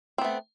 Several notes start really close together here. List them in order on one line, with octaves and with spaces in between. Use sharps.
C4 B3 A3